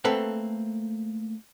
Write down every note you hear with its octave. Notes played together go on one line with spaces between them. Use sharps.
A3 A#3 C4 A4 B4 F#5